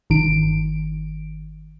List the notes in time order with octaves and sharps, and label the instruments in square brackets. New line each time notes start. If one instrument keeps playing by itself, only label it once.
[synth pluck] G1 D#3 D7